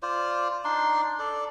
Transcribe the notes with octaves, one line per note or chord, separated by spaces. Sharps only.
F4 C5 D5
D4 D#4 C6
A4 D5